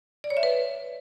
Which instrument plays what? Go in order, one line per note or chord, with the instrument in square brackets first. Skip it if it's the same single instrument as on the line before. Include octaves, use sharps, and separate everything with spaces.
[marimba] D5
C#5
E5
B4